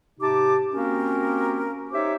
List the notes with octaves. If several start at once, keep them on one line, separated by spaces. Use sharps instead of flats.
G#2 C3 D#4 G4 A5 D6
A#3 C4 C#4 F#4 G4 A#4
D#4 G4 C5 C#5 E5 D6